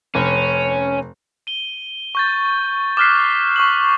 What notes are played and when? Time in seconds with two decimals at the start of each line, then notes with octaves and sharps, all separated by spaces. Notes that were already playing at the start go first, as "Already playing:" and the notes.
0.15 F1 C#4
1.47 D#7 G7
2.15 C#6 G6 A6
2.97 D6 D#6 F6 F#6 B6 C7
3.56 C#6 D#6 F#7